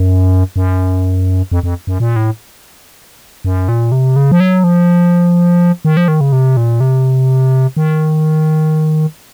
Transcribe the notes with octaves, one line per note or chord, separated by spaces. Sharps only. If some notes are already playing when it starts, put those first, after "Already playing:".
Already playing: F#2
F#2
F2
F2
F#2
A#2
A2
F#2
A#2
C3
C#3
F3
F#3
F3
D#3
F3
D#3
C#3
C3
A#2
C3
D#3